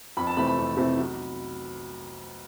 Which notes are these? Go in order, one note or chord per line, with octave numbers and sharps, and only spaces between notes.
F2 B5
A5
C3 E3 A3 C4 B5
B5
F2
C3 E3 A3 C4
B1